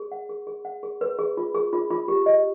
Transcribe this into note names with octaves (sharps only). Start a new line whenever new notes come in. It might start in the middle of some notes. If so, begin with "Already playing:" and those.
Already playing: G#4
F#5
G#4
G#4
F#5
G#4
B4
G#4
F4
G#4
F4
F4
G4
D#5